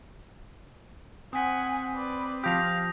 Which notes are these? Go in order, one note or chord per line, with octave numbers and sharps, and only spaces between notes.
C4 F#5 G#5 D#6 B6
B4 D5
F3 G4 F5 D#6 A#6 F7